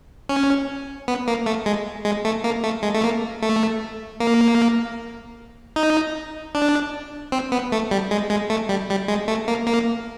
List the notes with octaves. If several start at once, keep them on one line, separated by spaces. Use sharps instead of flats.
C#4
B3
A#3
A3
G#3
G#3
A3
A#3
A3
G#3
A3
A#3
A3
A#3
D#4
D4
C4
B3
A3
G3
G#3
G#3
A3
G3
G3
G#3
A3
A#3
A#3